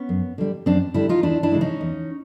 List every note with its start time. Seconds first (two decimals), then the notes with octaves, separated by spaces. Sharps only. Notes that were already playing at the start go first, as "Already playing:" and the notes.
Already playing: B3 C#4
0.09 F#2
0.38 D3 G3
0.66 F#2 C4 D4
0.94 D3 G3 D4 E4
1.09 D#4 F4
1.23 E2 D4 E4
1.43 D4 E4
1.52 C#3 E3 G#3
1.61 C#4 D#4
1.81 E2